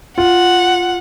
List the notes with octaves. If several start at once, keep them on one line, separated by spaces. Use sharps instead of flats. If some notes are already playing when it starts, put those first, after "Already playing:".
F4 F#5